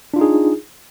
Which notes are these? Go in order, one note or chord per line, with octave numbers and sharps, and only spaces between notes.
D4 D#4 F4 G#4